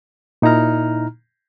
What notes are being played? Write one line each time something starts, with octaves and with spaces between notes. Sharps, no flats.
A#2 D#4 E4 A#5 F6